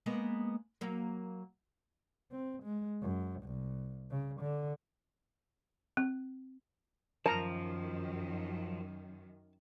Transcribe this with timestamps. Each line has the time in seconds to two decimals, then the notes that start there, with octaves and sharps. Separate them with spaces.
0.06 G#3 A#3 B3
0.81 F#3 A#3
2.32 C4
2.63 G#3
3.02 F#2
3.43 C2
4.11 C#3
4.40 D3
5.97 C4
7.26 F#2 D#3 F3 A#4 A5 A#5